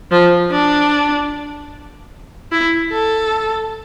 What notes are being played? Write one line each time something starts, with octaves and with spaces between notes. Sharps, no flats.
F3
D4
E4
A4